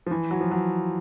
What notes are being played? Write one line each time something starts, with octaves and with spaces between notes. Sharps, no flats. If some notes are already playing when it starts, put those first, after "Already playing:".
F3
E3
F#3
F3
F#3